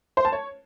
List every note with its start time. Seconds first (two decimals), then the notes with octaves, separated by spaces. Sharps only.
0.17 C5
0.25 A5
0.32 C#5